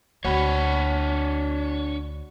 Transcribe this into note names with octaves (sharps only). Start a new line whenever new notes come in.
D2 D4 F#4 C#5 B5